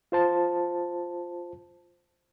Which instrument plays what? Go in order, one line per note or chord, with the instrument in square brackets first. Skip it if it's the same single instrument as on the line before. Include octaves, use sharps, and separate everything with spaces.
[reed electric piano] F4 C5 A5